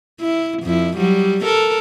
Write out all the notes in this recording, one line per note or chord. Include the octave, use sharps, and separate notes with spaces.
E4
F2 E4
F#3 G3
A4 A#4